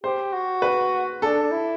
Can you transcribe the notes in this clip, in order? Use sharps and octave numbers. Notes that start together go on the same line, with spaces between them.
G4 C5
F#4
B4
D4 A4
D4
E4